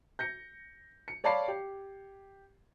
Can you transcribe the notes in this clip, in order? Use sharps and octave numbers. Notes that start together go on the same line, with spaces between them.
G6 A#6 C#7
C#7
C#5 D5 F5 A5 B5 C7
G4